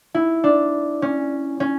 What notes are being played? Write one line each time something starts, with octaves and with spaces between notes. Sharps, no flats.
E4
D4
C#4
C#4